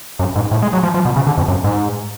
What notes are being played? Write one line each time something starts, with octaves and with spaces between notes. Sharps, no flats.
F#2
G#2
A2
G#3
F#3
F3
F3
B2
C#3
D3
F2
F#2
G#2